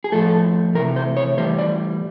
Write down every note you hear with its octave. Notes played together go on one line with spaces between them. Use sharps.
G#4
A2 F3 A3 A4
C3 E3 A3 A#4
C5
C#5
A2 E3 G3 C5
D5